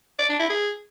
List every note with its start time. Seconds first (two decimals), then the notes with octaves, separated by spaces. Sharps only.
0.19 D5
0.29 D4
0.39 E4
0.50 G#4